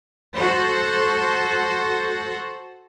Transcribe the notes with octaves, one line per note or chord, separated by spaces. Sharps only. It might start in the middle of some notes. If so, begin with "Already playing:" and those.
F#4 A4 C5